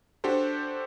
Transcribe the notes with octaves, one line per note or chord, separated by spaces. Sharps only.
D4 F#4 G4 A4 C5